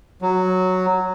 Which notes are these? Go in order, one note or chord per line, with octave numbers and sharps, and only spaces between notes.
F#3